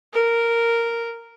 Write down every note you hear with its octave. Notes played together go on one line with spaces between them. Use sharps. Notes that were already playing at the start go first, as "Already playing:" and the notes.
A#4